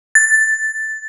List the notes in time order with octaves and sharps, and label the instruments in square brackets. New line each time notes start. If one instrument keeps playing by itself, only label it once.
[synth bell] A6